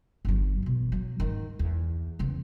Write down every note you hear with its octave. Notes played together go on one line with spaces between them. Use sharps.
G1 F#3
B2 E3
F#3
G#2 D#3
E2
E2 C#3